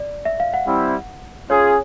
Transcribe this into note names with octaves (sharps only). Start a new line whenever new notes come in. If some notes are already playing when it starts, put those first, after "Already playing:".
Already playing: D5
E5
F5
F#5
G3 C4 E4
C#4 F4 G#4 C#5